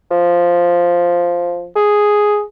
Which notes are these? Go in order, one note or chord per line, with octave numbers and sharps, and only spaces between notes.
F3
G#4